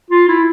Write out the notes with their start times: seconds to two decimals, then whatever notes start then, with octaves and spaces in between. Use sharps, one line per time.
0.10 F4
0.28 E4